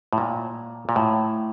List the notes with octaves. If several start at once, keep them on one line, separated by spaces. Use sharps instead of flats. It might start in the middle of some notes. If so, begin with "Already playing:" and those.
A2
A#2
A#2
A2